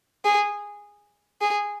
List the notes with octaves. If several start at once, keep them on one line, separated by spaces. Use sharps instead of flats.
G#4
G#4